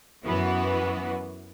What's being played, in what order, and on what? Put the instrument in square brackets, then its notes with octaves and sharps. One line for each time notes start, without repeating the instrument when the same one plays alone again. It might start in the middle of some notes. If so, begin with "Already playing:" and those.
[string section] F#2 E3 B3 F#4 B4